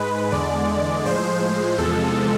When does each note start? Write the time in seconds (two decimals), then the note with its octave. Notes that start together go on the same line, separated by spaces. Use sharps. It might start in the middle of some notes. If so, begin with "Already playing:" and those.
Already playing: G#2 G#3 B4
0.32 E2 D3 G#3 D5
1.05 A2 F3 G#3 C5
1.42 C5
1.78 E2 C3 F3 G#3 A4